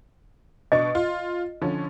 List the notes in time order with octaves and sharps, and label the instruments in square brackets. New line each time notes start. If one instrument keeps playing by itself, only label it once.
[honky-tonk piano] B2 D4 C#6 [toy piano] D#5
[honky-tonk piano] F4
D3 F3 C#4